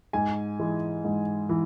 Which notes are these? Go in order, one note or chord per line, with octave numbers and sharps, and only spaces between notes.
G#2 G#5
E3 G#3
G#2
E3